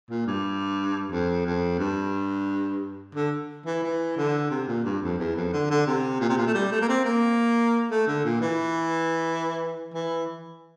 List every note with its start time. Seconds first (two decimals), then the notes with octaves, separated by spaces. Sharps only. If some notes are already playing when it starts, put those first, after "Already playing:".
0.10 A#2
0.27 G2
1.11 F2
1.46 F2
1.79 G2
3.15 D3
3.66 E3
3.83 E3
4.17 D3
4.50 C3
4.68 A#2
4.85 G2
5.02 F2
5.19 E2
5.36 F2
5.53 D3
5.70 D3
5.87 C3
6.20 A#2
6.29 C3
6.38 A#2
6.47 A3
6.54 G3
6.72 A3
6.81 A#3
6.89 C4
7.05 A#3
7.91 A3
8.07 D3
8.24 A#2
8.41 E3
9.94 E3